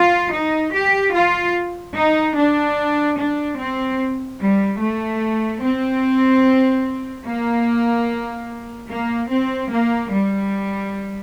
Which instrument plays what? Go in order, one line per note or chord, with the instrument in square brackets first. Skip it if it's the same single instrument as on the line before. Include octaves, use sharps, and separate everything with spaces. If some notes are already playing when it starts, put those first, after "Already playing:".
Already playing: [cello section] F4
D#4
G4
F4
D#4
D4
D4
C4
G3
A3
C4
A#3
A#3
C4
A#3
G3